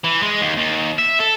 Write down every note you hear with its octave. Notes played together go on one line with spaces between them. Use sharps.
E3
G#3
D#2
D#2
E5
A4